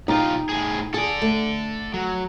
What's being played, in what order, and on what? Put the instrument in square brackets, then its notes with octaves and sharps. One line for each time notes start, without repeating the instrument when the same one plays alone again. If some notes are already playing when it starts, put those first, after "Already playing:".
[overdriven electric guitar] B1 F4 [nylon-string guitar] D#4 G4
[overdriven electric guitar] A2 G#4
[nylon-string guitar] G#4 [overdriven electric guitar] A4 D5
[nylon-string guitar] A3
[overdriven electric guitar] F#3